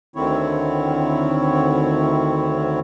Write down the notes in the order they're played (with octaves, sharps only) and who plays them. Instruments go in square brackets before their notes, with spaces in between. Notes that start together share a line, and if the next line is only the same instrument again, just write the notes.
[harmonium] D2 D3 D#3 C4 E4 C#5